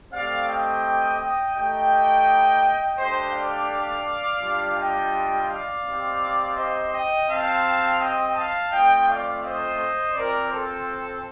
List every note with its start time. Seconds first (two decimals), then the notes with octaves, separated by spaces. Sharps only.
0.11 A3 C4 G4 D5 F5
0.47 D#5 G5
1.18 D#5 G5
1.54 A3 D#4 G4 D#5 G5
2.97 A3 D4 G4 C5 D#5
3.33 D5 F5
4.41 G3 D4 F4
4.76 D#5 G5
5.48 D5 F5
5.84 C4 D#4 G4
6.55 C5 D#5
6.92 D#5 G5
7.27 C4 G4 F5 A5
7.99 D#5 G5
8.35 F5 A5
8.71 A3 C4 F4 D#5 G5
9.06 D5 F5
9.42 C5 D#5
10.14 C4 F4 A#4 D5
10.50 A4 C5